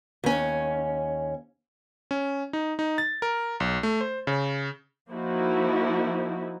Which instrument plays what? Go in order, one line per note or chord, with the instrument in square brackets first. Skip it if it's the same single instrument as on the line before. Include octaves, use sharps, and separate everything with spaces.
[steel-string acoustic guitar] D#2 C#4
[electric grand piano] C#4
D#4
D#4
A6
A#4
B1
A3
C5
C#3
[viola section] F3 A#3 D#4 E4 F#4